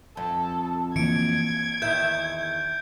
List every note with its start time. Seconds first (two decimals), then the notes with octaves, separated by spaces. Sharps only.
0.17 F2 A4
0.96 E3 A#3 G#6 C#7 D7
1.82 E2 D#3 E5 G6